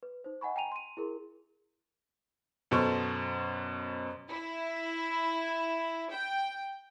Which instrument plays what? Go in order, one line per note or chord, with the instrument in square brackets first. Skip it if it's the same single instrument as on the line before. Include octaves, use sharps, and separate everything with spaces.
[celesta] B4
D#4 C5
D#5 F#5 G#5 B5 C#6
G5 G#5 A#5 D#7 F7
C6 D#7
E4 G#4 A#4
[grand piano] F#2 B2 A4 C5 C#6
[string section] E4
G5